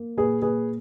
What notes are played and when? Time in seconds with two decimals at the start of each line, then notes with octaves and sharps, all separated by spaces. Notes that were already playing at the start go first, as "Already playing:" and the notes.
Already playing: A#3
0.17 A#2 G#4 B4
0.42 A#2 G#4 B4